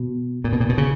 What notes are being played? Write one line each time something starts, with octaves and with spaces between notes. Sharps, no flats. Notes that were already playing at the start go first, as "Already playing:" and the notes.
Already playing: B2
A#2
B2
A#2
B2
C#3